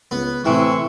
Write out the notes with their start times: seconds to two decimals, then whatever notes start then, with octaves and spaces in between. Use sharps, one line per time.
0.11 C#2 B3
0.45 A2 C3 E3 E4 C6 C#6